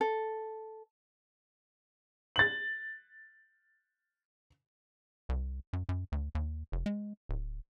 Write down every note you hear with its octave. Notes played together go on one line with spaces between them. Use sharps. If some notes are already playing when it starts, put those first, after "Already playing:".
A4
A6 F#7
C2
F#2
F#2
D2
D#2
F1
G#3
D1